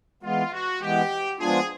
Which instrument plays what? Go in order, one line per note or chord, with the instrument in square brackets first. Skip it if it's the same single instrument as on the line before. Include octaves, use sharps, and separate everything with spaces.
[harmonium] E3 G#3 B3 [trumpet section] F4
[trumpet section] F#4
[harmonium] E3 G#3 B3 [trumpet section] G4
[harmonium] F3 G#3 B3 D4 F4 [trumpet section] G#4